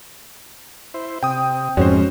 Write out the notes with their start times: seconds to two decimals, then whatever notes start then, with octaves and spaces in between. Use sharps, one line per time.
0.94 E4 C5
1.23 C3 G5 D#6
1.77 F2 G#2 G#3 C4 C#4 F#4 C5